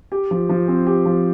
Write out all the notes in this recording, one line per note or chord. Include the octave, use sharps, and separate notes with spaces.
G4
F3
F3
C4
G4
F3